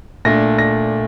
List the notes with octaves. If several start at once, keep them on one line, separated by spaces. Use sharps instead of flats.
A#2 A3 D4 A#6
A#6